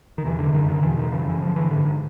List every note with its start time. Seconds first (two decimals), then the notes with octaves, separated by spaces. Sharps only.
0.18 D#3
0.24 E2 C3 E3
0.38 D3
0.53 F#2 D3 D#3
0.68 D#3
0.82 E2 B2 E3
0.97 D#3
1.12 F#2 C#3 E3
1.27 E3
1.41 G2 D3 F3
1.56 E3
1.70 G#2 D3
1.85 D#3